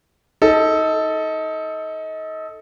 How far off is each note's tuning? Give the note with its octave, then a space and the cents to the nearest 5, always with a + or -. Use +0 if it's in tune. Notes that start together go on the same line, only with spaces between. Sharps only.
D#4 +25 A4 +0